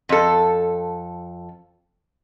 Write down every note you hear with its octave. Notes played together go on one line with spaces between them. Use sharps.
F2 A4